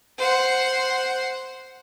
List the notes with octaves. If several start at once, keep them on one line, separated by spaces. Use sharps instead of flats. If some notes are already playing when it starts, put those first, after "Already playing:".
C5 F#5